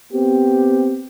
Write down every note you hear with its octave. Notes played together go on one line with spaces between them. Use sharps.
B3 C4 G4